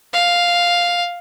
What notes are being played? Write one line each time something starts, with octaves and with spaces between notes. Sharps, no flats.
F5